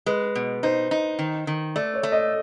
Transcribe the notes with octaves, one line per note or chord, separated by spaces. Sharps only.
G#3 B4
B2
D#4 C5
D#4
D#3
D#3
A3 D5
C#5
A3
D#5